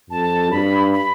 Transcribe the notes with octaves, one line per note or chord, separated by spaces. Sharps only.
F2 A5
G2 B5
B5